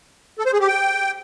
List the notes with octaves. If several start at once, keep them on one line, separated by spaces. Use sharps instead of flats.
A4
C5
G#4
G4
G5